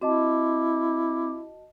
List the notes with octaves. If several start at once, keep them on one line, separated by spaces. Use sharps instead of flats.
C4 E4 F#4 D#5 A5 D6